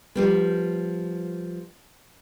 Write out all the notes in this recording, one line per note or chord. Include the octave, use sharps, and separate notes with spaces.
F3 G3 B3